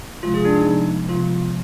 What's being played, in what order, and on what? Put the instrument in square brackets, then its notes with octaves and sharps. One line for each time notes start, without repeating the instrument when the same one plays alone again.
[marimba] C3 F3 G#3 [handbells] F4
[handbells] G#4
D4
D#4
[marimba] C3 F3 B3
[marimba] C3 F3 B3 [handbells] F4